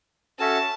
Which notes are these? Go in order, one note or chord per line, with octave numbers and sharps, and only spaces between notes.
C#4 F#4 A4 C#5 E5 A5